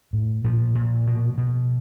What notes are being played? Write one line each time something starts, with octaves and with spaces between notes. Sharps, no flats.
A2
A#2 F3
A#2
B2
B2